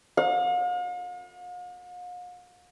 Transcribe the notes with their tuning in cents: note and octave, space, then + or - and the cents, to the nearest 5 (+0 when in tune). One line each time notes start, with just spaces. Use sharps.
F5 +45